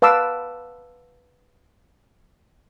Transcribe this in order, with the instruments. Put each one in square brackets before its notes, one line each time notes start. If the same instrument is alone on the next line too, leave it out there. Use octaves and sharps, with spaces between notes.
[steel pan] B4 F5 A5 D6 E6